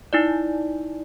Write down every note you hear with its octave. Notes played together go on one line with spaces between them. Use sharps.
D#4 E4 D5